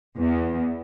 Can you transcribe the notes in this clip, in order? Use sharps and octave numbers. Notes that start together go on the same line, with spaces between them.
E2